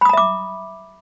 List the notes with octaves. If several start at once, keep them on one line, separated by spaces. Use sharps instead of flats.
E5 A#5 B5 D6 D#6